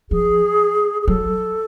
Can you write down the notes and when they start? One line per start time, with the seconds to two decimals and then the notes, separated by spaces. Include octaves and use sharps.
0.11 F3 G#4
1.02 G#4
1.08 F#3 A4